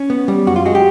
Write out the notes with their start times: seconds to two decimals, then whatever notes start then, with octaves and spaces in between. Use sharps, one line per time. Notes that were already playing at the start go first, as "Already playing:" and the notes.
Already playing: C#4
0.10 B3
0.28 G3
0.47 F#2 F#4
0.56 F4
0.65 G#3 F#4
0.75 G4